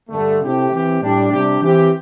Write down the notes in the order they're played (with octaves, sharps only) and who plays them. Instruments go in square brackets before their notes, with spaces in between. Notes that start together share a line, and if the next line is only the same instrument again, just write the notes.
[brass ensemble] G2 D3 A3
C3 A3 C4 E4 G4
E3 C4 G4
A2 G3 D4 G4
C3 G3 D4 G4
E3 C4 G4